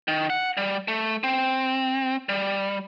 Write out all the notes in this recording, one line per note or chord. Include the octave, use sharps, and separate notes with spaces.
D#3
F#5
G3
A3
C4
G3